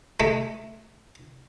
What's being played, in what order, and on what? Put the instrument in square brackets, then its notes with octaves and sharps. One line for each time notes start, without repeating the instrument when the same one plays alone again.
[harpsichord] G#3 A3